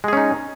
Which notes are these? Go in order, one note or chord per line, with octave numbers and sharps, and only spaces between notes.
G#3 C#4 D#4 G#4